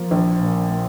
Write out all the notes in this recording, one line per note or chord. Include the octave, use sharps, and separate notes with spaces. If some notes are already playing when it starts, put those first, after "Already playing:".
Already playing: F3 A#3
A#1
A#2
A#3